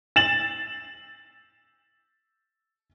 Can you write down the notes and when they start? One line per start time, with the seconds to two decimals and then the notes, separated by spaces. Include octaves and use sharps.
0.16 A6 E7 F#7